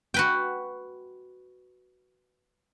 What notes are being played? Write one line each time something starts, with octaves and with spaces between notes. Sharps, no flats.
F#4 B4 G5